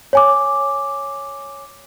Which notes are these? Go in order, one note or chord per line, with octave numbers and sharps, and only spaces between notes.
C#5 G#5 D6